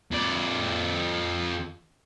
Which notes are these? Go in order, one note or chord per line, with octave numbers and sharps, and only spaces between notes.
F2 D5